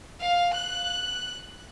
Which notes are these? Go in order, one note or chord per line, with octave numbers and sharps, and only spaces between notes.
F5
F#6